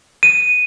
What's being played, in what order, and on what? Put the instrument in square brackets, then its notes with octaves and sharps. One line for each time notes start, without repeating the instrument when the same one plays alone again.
[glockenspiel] D#7